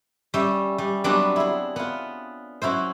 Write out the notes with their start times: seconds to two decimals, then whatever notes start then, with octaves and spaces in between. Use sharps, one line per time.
0.34 G3 C#4 E5 G5
0.78 G3
1.04 F#3 G3 B3 C4 D4
1.36 E4 G#4
1.76 B3 F4
2.62 F#3 C#4 E4 C5